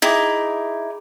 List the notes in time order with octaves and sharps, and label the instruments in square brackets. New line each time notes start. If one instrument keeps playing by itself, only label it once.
[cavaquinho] D#4 E4 [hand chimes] G#4 G5 D6